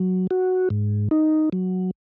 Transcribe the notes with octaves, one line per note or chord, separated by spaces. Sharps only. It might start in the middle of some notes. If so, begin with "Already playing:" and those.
Already playing: F#3
F#4
G#2
D#4
F#3